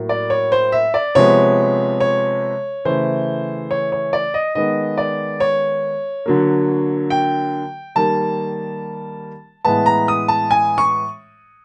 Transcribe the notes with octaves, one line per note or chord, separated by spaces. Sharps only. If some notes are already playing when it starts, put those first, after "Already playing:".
Already playing: A2 F#3 A#3
D5
C#5
C5
E5
D5
C3 F3 G#3 B3 C#5
C#5
C#3 E3 A3 C5
C#5
C#5
D5
D#5
D#3 G#3 B3 D#5
D5
C#5
D3 F#3 A#3
G5
D#3 G3 A#3 A5
A2 E3 G#3 B3 A5
A#5
D#6
A5
G#5
C#6